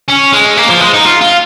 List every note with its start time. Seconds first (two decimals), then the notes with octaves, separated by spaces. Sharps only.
0.08 C#4
0.33 G#3
0.57 A#3
0.69 F3
0.80 G#3
0.93 D#4
1.05 F4
1.21 F4